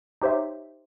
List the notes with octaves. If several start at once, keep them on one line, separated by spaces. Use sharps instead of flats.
D#4 G4 C5 C#5 E5